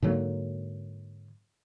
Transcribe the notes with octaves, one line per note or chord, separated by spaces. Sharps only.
G#2 D3 F#3 A#3